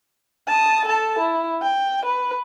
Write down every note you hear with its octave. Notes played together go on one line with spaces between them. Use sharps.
A5 D#6
A4 A5
E4
G5
B4